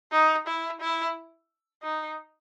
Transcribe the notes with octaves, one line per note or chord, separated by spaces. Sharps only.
D#4
E4
E4
D#4